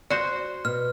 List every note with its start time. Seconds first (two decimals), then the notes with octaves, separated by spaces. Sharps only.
0.10 F#4 C5 D5
0.65 B2 F6